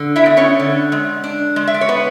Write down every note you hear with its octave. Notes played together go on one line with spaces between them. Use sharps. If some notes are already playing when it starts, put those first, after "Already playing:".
Already playing: D3
E4 E5
B3
C#4 C#5
D3
G#3
D4
G#3
E5
D5
C#5
B3 B4